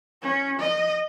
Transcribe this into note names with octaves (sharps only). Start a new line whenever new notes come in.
C#4
D#5